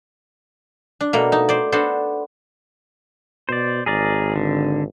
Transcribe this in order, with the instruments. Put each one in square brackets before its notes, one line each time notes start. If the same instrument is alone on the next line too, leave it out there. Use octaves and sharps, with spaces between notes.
[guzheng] D4
B2 A3 A#3
D#4 A5
C5 D5
B3 D4 F#4 A4 C5
[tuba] B2 [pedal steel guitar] C5 D5
[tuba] G#1 [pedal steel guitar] G#4 A#4 D5
[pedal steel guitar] D3